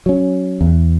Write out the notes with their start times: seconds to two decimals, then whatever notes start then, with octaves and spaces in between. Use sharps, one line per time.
0.06 F#3 C#4
0.61 E2